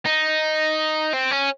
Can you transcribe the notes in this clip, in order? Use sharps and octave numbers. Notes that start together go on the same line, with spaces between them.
D#4
C4
C#4